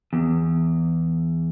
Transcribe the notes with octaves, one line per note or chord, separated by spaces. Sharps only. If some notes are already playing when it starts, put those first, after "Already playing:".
E2